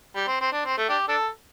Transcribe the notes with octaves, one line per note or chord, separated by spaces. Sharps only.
G3
C4
C4
D4
C4
A3
D4 G4
D4 A4